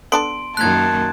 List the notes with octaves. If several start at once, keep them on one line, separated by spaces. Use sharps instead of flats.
B3 D4 A4 C6 D7
F#2 D#3 A#3 A5 F#6 G#6